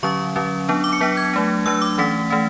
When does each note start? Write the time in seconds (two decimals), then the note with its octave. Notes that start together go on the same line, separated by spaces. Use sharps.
0.03 D3 F#3 C#4 C#6
0.36 D3 F#3 C#4
0.69 F#3 B3 D4
0.84 D6
0.93 C#7
1.01 F#3 B3 D4 B6
1.17 G#6
1.33 F#3 A3 D4
1.66 F#3 A3 D4 E6
1.78 E6
1.82 D6
1.98 E3 A3 C#4 B6
2.30 E3 A3 C#4